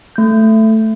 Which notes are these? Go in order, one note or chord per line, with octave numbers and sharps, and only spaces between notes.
A3 G6